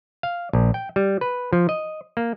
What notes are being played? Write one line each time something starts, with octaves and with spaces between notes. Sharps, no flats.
F5
A#1
G5
G3
B4
F3
D#5
A#3